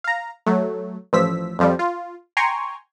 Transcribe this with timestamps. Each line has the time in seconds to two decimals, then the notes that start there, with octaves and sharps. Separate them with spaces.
0.04 F5 A#5
0.46 F#3 A3
1.13 A1 F3 E6 B6
1.59 F2 F3 G3
1.79 F4
2.37 G5 G#5 A#5 C6 C#6